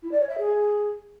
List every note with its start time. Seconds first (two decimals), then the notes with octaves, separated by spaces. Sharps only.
0.03 E4
0.11 D5
0.20 C#5
0.29 E5
0.38 G#4